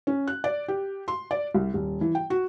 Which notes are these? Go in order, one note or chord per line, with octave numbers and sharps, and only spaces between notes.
C#4
F#6
D5
G4
C6
D5
C2
D#1
E3
G5
F#4